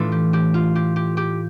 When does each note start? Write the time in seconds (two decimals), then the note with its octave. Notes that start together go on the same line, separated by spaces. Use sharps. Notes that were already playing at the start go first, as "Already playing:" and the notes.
Already playing: A2 E3 A3 D4 F4 A4
0.12 G4
0.33 G4
0.54 F4
0.75 G4
0.96 G4
1.17 G4